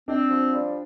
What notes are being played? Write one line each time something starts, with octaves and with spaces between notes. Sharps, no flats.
C4 D4
F3
G3